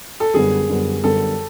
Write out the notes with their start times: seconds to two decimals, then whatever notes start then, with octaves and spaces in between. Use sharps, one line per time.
0.20 A4
0.34 F#2 D3 G3 B3 G#4
0.68 F#2 D3 G3 B3
1.03 F#2 D3 G3 B3 A4